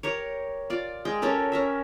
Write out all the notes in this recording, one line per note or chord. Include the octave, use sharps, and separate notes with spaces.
G4 A#4 C#5
F4 D5
G#3 G5
C#4 G4 A4 A#4
C#4 A#4 E5